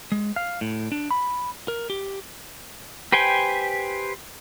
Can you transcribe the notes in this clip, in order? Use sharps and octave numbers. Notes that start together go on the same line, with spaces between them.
G#3
F5
A2
D4
B5
A#4
G4
G4 B4 C5 G5 G#5